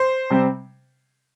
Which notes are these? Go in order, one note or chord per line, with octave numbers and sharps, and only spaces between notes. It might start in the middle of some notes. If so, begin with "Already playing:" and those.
Already playing: C5
C3 G3 C4